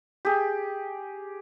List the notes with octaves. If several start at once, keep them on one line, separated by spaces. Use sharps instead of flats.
G4 G#4